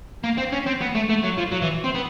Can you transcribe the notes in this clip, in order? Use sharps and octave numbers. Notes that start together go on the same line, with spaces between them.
A#3
C4
C#4
C4
B3
A3
A3
F#3
F3
F#3
E3
C4
B3